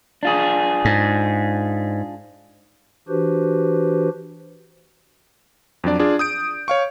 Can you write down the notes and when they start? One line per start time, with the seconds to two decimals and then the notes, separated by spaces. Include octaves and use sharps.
0.23 D4 F4 G#4
0.85 G#2
3.08 E3 D4 F#4 G4 B4 C5
5.84 F2 F#3 D4 D5
5.99 D4 F4 G#4 D5
6.19 D#6 G6 D7
6.68 C#5 F5 C#6